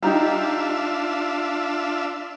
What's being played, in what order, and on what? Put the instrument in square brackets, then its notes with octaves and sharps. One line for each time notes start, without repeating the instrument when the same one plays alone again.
[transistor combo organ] D4 F4 E5 [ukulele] D#4 G4 A#5